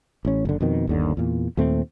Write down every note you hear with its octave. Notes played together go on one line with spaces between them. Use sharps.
A1 C#4
F#1 D3
F2 B2 D#3
G1 D#2 D3
E2 A#2
D#2 A#2 A3 C4